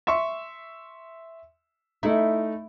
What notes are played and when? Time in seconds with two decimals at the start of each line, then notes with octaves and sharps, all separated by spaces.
0.07 E5 C6 C#6
2.03 A3 D#4 E4